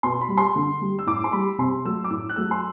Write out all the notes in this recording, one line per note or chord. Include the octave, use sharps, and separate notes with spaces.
B2 C6
B5
G3
C6
D3
G3
E6
A2 D6
C6
G3 B5
C3 C6
F#3 A3 E6
D6
A2 E6
F#6
F#3 A3 E6
C6